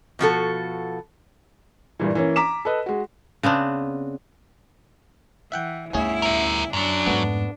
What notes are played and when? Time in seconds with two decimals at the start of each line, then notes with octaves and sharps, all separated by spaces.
0.19 B2 F3 F#4 A4
1.99 G2 A#2 E3
2.15 E3 A#3 C#4
2.36 A#5 D6 B6 E7
2.65 A4 B4 D#5
2.86 G#3 F#4
3.43 C#3 B3 C4 D4
5.52 E3 E5 F#5 G5
5.93 G1 D2 C#4 E4 G#4
6.22 A#4 E5
6.73 F#2 F#3 D4
7.06 F2 G#2 A3 B3